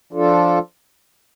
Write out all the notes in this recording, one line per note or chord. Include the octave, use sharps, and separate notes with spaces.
F3 D4 F4 A4